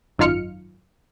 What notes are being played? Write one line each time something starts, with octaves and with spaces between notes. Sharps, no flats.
G#1 F#2 D#4 F4 F6 C#7